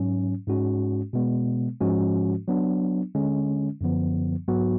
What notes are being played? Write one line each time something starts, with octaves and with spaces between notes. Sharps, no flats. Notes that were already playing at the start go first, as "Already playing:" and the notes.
Already playing: G#2 F#3 C#4
G#2 G#3 C#4 F#4
B2 G#3 B3
G#2 F3 G#3 C#4 F#4
F#3 B3 D4
D3 G#3 C#4
F#2 D3 F3 B3
G#2 F#3 B3 F#4